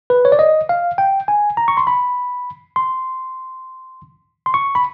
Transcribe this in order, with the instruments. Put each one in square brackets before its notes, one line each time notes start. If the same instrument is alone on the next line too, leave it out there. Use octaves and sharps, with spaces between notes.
[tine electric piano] B4
C#5
D5
D#5
F5
G5
G#5
A#5
C#6
C6
B5
C6
C6
C#6
B5